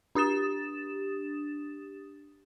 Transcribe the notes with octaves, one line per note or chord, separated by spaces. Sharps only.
D4 G4 D#6 A6 E7